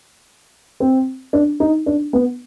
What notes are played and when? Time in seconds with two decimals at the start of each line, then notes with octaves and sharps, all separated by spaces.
0.80 C4
1.33 D4
1.60 D#4
1.86 D4
2.13 B3